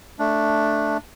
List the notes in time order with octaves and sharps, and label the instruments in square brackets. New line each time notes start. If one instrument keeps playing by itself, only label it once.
[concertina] A3 D4